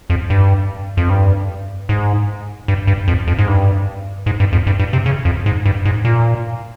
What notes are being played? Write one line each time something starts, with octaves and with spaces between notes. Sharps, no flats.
F2
G2
F2
G2
G#2
G2
G2
F2
F2
G#2
G2
G#2
G2
F2
G2
G2
C3
C#3
F2
G#2
G2
G#2
A#2